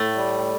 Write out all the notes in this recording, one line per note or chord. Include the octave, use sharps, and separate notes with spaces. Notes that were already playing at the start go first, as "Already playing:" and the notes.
Already playing: A2 A3
G3